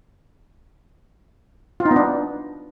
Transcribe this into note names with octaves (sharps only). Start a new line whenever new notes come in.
F4
D#4
B3
D4